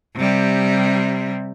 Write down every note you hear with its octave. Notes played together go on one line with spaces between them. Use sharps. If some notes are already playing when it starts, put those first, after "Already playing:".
C3 G3